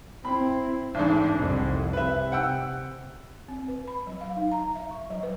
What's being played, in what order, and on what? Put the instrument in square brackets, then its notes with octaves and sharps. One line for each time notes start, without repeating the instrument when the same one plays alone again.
[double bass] C4 E4 [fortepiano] B5
[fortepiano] A1 G#2 [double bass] D4
[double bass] C2 F2
[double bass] C3 [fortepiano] B4 E5
[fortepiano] F#5 G5 E6
[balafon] C4
B4
B5
F#3
F5
D#4
A#5
E5
C#6
F#3
B4